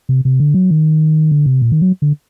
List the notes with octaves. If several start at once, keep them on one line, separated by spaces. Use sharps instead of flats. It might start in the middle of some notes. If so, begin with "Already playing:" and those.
C3
C3
D3
F#3
D#3
D3
C3
A#2
D#3
F#3
D3